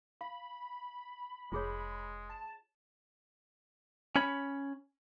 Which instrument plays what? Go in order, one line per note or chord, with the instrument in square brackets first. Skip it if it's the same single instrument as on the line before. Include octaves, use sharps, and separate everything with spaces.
[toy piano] F5 [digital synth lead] B5
[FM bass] F1 [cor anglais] G#3 [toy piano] F4 G#4 C#5
[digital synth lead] A5
[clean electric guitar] C#4 C#5 B5